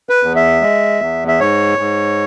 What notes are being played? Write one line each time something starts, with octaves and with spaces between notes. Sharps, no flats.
B4
E2
E5
G#3
E2
E5
G#2 C#5
G#2